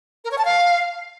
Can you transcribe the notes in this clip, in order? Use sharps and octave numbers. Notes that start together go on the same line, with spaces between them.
A#4
C#5
A5
F5